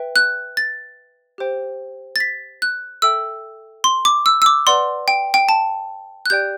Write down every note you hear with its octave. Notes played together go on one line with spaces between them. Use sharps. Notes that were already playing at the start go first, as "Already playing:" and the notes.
Already playing: B4 E5 G5
F#6
A6
G4 C5 G5
A6
B6
F#6
A4 E5 G5 E6
C6
D6
E6
E6
D6
B4 D5 F#5 C6
G5
G5
A5
F#6
G4 D5 G5 G6